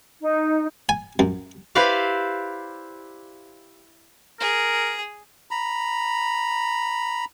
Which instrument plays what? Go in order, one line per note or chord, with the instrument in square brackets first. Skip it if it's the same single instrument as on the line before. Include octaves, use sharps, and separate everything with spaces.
[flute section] D#4
[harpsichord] G#5
F#2
[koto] E4 G4 B4 C5 D5 F5
[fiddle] G#4 [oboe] A#4
[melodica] A#5 B5